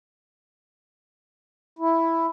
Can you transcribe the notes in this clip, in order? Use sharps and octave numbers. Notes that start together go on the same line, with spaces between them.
E4